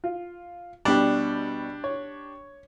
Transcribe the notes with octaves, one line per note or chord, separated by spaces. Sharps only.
F4
B2 G3 D4 G4
C#5